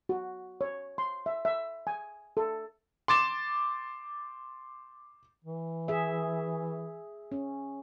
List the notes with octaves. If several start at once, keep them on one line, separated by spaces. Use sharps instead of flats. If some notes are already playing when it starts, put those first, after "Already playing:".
F#4
C#5
C6
E5
E5
G#5
A4
C6 D6 A6 E7
E3
G#4 E5
C#4